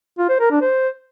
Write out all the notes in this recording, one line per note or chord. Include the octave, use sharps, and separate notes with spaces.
F4
C5
A#4
D4
C5